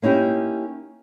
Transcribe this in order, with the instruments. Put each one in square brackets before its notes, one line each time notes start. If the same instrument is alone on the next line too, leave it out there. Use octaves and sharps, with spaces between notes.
[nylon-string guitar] A#3 C#4 D#4 E4 G4